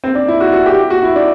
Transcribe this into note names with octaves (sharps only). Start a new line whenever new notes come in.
C4
D4
E4
F#4
F#4
G4
F#4
E4
D4